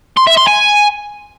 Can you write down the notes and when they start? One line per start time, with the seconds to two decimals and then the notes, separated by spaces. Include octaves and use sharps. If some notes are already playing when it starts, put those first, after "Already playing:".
0.17 C6
0.27 E5
0.37 C6
0.47 G#5